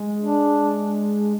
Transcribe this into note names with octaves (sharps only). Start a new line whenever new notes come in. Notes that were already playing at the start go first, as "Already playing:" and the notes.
Already playing: G#3
D4